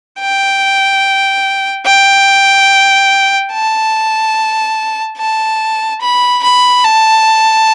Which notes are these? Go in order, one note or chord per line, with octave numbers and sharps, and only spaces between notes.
G5
G5
A5
A5
B5
B5
A5